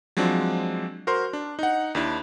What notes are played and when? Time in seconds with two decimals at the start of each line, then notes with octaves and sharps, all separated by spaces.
0.17 F3 F#3 G#3 C4 D4
1.07 F#4 A#4 C5 C6
1.33 D4
1.59 D#4 F#5
1.95 D#2 D4 E4